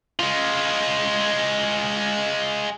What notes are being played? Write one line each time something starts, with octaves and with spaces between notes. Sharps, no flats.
G#3 F4